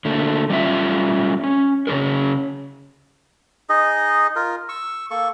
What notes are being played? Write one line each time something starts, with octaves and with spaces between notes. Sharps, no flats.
D3 A3 A#3
G3 A3 C#4 F4 E5
C#4
C#3 C#4 E4 G#4 A#4
D#4 G#4 D#5
F4 A#4
C#6 E6
A#3 A4 C#6